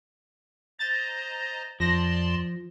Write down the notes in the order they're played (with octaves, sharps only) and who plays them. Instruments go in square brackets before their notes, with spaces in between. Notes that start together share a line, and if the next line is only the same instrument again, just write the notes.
[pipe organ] C5 D#5 A#5 [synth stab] A6
[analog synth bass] F2 [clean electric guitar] F3 [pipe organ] D5 A5 C6 [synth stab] A#6